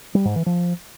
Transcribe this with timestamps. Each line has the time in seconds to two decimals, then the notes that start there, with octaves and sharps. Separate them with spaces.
0.15 G3
0.25 G#2
0.36 E3
0.46 F3